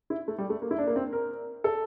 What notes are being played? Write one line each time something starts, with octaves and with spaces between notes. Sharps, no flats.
E4
A3
G3
A3
A#3
E4
D4
A#3
C4
A#4
A4